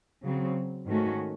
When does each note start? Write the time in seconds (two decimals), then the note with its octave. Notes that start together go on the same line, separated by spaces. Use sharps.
0.22 C#3 F#3 C4
0.86 G#2 D#3 A3 C#4 F#4